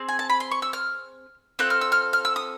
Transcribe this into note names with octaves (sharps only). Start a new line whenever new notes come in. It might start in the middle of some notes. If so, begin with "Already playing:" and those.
Already playing: C4 G#4
G#5
A5
B5
C6
C#6
E6
F6
C4 F4 A4 F#6
F6
E6
F6
F6
E6
D#6